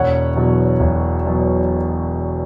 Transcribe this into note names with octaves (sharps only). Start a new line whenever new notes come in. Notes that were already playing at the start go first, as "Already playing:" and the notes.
Already playing: E1 C#5 F#5
E2 B2 F#3
E1
E2 B2 F#3